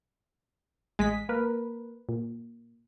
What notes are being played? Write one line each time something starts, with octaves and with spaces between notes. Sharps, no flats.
A1 G#3 D#5 B6
A#3 A#4 B4
A#2